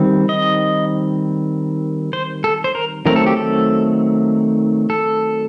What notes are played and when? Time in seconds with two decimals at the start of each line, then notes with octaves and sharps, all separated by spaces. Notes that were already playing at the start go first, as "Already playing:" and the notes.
Already playing: D#3 G3 C4
0.29 D#5
2.13 C5
2.44 A4
2.64 C5
2.75 A#4
3.06 D#3 F#3 A3 C4 A#4
3.16 A4
3.27 G4
3.37 A4
4.90 A4